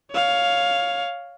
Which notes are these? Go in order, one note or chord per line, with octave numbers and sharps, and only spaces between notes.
C#5 F5